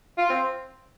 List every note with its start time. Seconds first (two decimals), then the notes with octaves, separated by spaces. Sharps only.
0.18 F4
0.30 C4